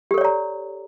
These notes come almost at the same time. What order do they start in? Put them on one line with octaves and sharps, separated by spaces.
G4 A4 C#5 D5 A#5